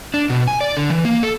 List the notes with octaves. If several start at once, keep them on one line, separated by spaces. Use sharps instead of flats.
D4
B2
G#5
D5
D3
E3
A#3
A4